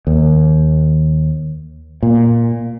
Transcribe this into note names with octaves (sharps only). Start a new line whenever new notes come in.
D#2
A#2